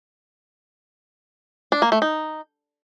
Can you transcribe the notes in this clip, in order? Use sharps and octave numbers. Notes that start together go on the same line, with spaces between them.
D4
A#3
A3
D#4